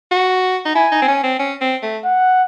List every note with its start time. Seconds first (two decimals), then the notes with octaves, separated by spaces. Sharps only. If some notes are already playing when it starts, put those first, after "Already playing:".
0.11 F#4
0.65 D#4
0.75 E4 G#5
0.92 D#4
1.02 C4
1.08 C#4
1.23 C4
1.39 C#4
1.61 C4
1.82 A3
2.04 F#5